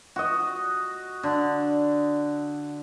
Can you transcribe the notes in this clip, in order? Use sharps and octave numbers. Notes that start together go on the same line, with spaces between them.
F#4 D#5
D3